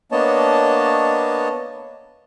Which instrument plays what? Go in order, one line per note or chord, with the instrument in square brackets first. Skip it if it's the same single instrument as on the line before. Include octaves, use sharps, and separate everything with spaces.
[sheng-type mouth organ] A#3 B3 D4 C#5 D#5 A5